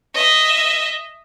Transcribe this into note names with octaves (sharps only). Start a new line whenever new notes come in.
D#5 E5